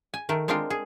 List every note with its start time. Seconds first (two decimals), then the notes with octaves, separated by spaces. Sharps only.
0.14 G#5
0.29 D#3 A3 A#4
0.48 G#3 C4 D4 F4 A#4
0.70 G#4